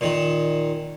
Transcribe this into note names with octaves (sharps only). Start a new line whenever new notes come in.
A#2 D#3